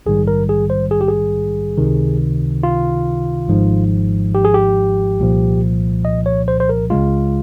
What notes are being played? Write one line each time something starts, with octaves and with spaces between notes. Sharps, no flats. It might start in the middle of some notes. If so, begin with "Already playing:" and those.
A#1 G#2 D#3 G3 G#4
A#4
G#4
C5
G#4
G4
G#4
C#2 C3 D#3
F4
G#1 G#2 F3
G4
G#4
G4
C2 A#2 F3
D#5
C#5
C5
C5
A#4
C#2 C#3 G#3 F4